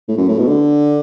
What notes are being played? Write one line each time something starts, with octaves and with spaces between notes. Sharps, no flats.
A2
F#2
A2
B2
D3